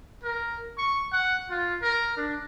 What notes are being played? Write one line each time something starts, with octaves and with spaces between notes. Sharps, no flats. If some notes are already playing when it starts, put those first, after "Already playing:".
A#4
C#6
F#5
F4
A#4
D4